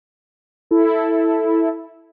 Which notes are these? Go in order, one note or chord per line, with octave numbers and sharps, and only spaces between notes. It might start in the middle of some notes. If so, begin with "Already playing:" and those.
E4 A4